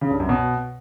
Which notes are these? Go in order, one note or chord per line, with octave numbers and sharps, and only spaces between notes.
C#3
G2
F#2
B2